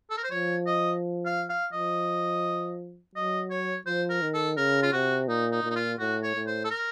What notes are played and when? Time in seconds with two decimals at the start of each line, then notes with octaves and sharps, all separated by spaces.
0.10 A4
0.18 A#4
0.24 C5
0.31 F3 C#5
0.67 D#5
1.26 F5
1.50 F5
1.73 F3 D#5
3.15 F#3 D#5
3.51 C#5
3.86 F3 C5
4.10 A#4
4.22 D#3
4.34 A4
4.57 C#3 A#4
4.83 F4
4.93 C3 F#4
5.28 A#2 D#4
5.52 D#4
5.64 A#2
5.70 D#4
5.76 F4
5.99 A2 F#4
6.24 C#5
6.35 A2
6.47 C5
6.65 A4
6.71 A#4